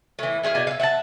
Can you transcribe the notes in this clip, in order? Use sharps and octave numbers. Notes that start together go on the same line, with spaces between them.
A2 E3
E4 G#4 C5 F5
B2 D4 G#5
E5 F5
E5 F#5 G5 A5